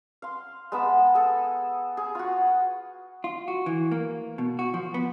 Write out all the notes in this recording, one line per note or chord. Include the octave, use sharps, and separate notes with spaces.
F5 C6
G#3 B3 A5 B5
G#4 A4
G#4
F4 F#4
F4
F#4
E3
A#3
B2
F#4
F3
B3